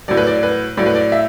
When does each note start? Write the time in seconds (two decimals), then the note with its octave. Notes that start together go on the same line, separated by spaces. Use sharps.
0.08 A2 F#3 D5
0.17 B4
0.27 D5
0.43 B4
0.77 A2 F#3 D5
0.86 B4
0.95 D5
1.12 E5